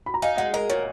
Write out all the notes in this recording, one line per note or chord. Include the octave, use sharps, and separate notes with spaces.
B5
A#5
D#4 F5 G#5
G#3 D#5 F#5
A#4 D#5
A#2 C#5